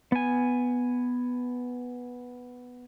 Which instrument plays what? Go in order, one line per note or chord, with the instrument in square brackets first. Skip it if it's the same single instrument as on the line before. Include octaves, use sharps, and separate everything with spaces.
[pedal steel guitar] B3 G#5